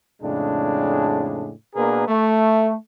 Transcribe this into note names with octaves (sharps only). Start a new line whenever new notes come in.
F2 A2 C#3 G#3 D4
B2 A#3 D4 G#4 A#4 B4
A3